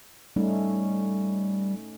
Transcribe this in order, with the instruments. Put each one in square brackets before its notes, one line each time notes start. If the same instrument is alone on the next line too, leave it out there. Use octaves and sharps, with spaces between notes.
[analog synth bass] G3 [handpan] A3 C#4 D#4